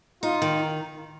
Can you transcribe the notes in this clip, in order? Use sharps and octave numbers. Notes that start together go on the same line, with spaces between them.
D#4 F4
D#3